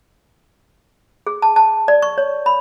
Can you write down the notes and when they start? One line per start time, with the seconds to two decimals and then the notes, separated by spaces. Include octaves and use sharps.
1.27 G#4
1.42 A5
1.56 A5
1.88 D5
2.02 C#6
2.18 C#5
2.46 B5